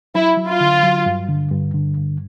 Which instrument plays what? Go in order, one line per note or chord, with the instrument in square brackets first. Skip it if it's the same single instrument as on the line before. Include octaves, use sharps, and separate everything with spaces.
[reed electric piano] F#3 [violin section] E4
[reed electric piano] F#3
[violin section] F4
[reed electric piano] D3
F#3
G2
D3
G2
D3
G2